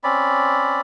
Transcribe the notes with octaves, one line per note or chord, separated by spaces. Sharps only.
C4 C#4 D5 B5